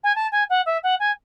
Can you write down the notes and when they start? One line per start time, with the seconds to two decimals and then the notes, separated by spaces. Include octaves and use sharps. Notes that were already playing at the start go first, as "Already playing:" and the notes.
0.03 G#5
0.15 A5
0.31 G#5
0.49 F#5
0.65 E5
0.83 F#5
0.99 G#5